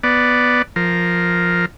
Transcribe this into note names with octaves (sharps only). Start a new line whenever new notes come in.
B3 D5
F3 A#4